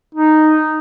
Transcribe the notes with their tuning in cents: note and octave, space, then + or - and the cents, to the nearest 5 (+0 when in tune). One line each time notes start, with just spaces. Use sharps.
D#4 -5